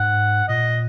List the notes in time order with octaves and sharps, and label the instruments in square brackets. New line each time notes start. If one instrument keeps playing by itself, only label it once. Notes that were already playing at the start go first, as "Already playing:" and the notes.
Already playing: [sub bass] G#2 [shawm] F#5
[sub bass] A#2 [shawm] D#5